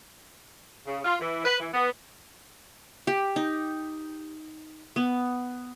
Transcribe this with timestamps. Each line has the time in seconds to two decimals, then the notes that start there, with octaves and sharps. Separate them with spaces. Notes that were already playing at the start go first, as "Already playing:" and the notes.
0.86 C#3
1.04 F4
1.20 E3
1.45 B4
1.59 E3
1.73 B3
3.07 G4
3.36 D#4
4.96 B3